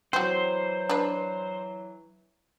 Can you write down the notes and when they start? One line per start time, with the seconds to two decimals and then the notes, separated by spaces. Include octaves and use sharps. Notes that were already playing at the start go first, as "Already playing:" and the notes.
0.13 E3 F#3 C4 F#4 C5
0.89 D4 B4